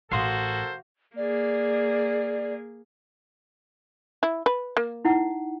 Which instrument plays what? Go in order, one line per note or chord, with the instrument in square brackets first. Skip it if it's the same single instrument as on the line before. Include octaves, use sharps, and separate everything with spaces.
[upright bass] A1 [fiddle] F#4 [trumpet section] A4 A#4 C5 [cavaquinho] F5 C6 D#6
[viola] A#3 G#4 [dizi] D5
[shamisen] E4
B4
A#3
[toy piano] D#4 E4 F#5